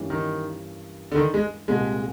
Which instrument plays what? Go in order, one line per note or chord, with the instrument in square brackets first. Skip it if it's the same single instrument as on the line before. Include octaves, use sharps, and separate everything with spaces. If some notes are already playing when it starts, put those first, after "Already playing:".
Already playing: [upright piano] G2 E3 G3 A#3 C#4
[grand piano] D#3
D3
D#3
G#3
[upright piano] C2 A#2 G3 [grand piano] G#3